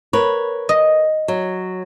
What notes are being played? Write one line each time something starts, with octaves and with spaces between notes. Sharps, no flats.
A#4 B4 C#5
D#5
F#3